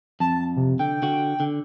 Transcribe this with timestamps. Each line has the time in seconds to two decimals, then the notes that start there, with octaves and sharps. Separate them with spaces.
0.20 F2 A5
0.56 C3
0.79 D3 G5
1.02 D3 F#4
1.40 D3